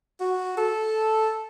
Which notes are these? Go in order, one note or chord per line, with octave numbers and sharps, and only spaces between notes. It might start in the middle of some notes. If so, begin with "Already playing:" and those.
F#4
A4